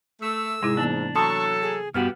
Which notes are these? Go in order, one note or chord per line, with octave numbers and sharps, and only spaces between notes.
A3 E6
G#2 C3 G#3 E4
E3 A#3 B3 D4
F#3 A4 A5 C6 C#6 D#6
G#4
G2 B3 F#4 G4 F6